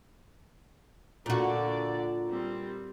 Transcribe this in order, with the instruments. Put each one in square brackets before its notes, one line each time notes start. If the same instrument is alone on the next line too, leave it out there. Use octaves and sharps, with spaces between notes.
[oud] A#2 F#4 [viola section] D3 D5
[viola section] G3 C4